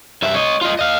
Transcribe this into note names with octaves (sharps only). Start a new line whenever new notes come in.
G2 E5
C#5 D#5
F4 D#5
D#5 F5